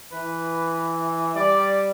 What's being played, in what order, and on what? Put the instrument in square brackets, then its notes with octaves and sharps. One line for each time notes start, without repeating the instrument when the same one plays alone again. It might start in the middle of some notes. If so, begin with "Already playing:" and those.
[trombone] E3 [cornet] B4
[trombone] G3 [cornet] D5